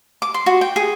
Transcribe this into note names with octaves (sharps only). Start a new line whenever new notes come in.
D6
C6
F#4
G5
G#4